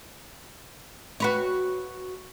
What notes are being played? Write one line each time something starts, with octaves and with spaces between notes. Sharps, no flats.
F#4 B4 C#5